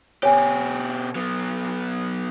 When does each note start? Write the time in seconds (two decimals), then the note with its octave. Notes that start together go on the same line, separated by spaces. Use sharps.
0.23 B2 G4 C#5 G#5
1.16 F#3 B3